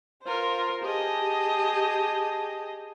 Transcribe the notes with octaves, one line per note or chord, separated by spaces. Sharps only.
F4 A#4 C5
G4 G#4 D#5 A5